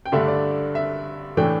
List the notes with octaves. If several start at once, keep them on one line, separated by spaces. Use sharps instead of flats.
G5
G2 D3 A3 D4 E5
D5
E5
A2 E3 A3 D4 G5